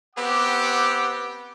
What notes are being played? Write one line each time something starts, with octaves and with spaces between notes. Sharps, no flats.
B3 C4 G4 F#5 D6